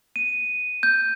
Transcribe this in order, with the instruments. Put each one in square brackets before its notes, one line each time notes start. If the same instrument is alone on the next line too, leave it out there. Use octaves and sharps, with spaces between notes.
[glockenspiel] D#7
G6